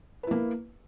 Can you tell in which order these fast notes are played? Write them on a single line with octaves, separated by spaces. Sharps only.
B4 E4 A#3